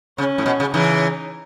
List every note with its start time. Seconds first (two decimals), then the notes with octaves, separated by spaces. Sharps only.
0.18 C#3 C#4
0.38 A2
0.46 B2
0.60 C#3
0.74 C#3 E3 D#4